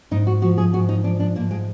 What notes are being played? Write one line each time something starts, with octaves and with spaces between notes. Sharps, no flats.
G#2 D#4
F#4
F3 F#4
G#4
G#2 F#4
D#4
F3 D4
D4
G#2 A#3
G#3